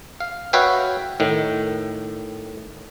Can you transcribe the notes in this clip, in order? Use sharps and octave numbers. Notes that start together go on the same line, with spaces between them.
F5
F#4 B4 C#5 E5 F5 G5
A2 D#3